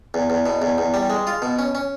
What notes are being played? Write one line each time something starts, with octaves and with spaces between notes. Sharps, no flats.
E2
E2
B2
E2
E2
G3
G#3
F4
B2
C#4
C#4